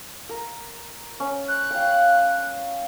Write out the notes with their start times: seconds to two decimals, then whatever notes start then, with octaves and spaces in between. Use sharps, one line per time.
0.29 A#4
1.20 C#4
1.48 F#6
1.71 F5 G5